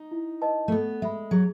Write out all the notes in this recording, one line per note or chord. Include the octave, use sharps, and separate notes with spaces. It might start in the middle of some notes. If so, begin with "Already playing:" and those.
Already playing: D#4
E4
B4 D#5 A5
A3
B3 A4
G#3 E5 B5
F#3 G#4